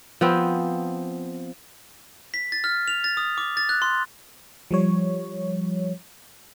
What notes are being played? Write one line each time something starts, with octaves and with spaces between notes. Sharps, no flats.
F3 B3 C4
B6
A6
F6
F7
A6
D#6
D6
A6
F#6
C6
F3 G3 C#5